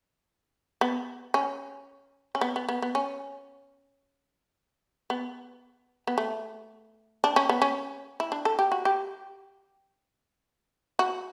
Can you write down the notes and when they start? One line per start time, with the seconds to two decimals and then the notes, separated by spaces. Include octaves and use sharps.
0.81 B3
1.34 C#4
2.35 C#4
2.41 B3
2.56 B3
2.69 B3
2.82 B3
2.95 C#4
5.10 B3
6.07 B3
6.18 A3
7.24 D4
7.36 C#4
7.49 B3
7.62 C#4
8.20 E4
8.32 D4
8.45 A4
8.59 G4
8.72 F#4
8.85 G4
10.99 F#4